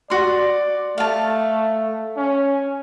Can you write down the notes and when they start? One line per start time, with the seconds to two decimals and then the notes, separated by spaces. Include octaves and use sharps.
0.10 F#4 D5 C6
0.98 A3 F5 A5
2.16 C#4